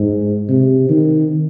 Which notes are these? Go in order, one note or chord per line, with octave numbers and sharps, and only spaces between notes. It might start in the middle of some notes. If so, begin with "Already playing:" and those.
Already playing: G#2
C3
D#3